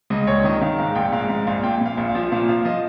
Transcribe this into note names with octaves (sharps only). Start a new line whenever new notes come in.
C#2 D#5
A#1 C#5
D#3 D#5
D#3 F5
G#2 F5
A#1 G5
G#2 F5
G#2 F5
A#1 F5
A#2 G5
A#2
F5
A#1
F5
F3
A#2 F5
F3 F5
F3 D#5